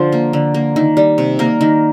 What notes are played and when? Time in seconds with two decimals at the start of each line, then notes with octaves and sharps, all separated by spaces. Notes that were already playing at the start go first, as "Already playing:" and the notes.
Already playing: D3 F3 C5
0.12 A#3
0.33 D3
0.54 A#3
0.76 D#3
0.97 G3
1.18 C3
1.39 A#3 A#4
1.61 D#3